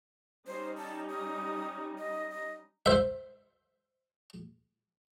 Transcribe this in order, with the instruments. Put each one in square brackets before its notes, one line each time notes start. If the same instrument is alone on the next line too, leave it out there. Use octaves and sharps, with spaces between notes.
[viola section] G3 C#4 D#4 [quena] C5
[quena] A5
D#6
D#5
D#5
[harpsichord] C5 E5